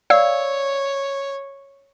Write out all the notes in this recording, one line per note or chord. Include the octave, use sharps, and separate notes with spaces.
C#5 D5 F5 E6